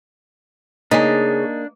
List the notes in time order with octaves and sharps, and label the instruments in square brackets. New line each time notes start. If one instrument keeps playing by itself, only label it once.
[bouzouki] C#3 [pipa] G#3 D#4 [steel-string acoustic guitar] A#3 [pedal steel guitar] D4